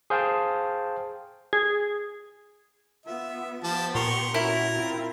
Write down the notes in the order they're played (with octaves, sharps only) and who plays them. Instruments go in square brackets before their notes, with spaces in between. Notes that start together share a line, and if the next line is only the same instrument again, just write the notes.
[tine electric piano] G#4 C5 F5 G5 A5
[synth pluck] G#4
[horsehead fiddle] B3 F4 [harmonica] E5
[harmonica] F3 A5 [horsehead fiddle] B3 G4
[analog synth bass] A#2 [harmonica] A#4 C6 C#6
[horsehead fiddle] C#4 F#4 [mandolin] E4 [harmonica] A#4
[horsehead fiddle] C4 F4